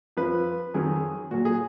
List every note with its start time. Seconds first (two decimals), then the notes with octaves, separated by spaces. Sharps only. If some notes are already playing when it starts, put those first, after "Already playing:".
0.17 F2 F3 B4
0.74 F2 D#3 F#3 G#4
1.31 A#2 F#3 F#4
1.45 G#4